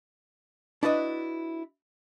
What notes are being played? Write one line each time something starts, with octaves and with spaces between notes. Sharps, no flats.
D4 E4 F#4 B4 D#5